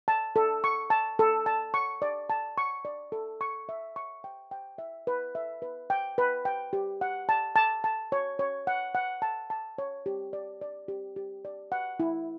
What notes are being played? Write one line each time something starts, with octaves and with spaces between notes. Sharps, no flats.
A5
A4
C#6
A5
A4
A5
C#6
D5
A5
C#6
D5
A4
C#6
E5
C#6
G5
G5
E5
B4
E5
B4
G5
B4
G5
G4
F#5
A5
A5
A5
C#5
C#5
F#5
F#5
A5
A5
C#5
G4
D5
D5
G4
G4
D5
F#5
E4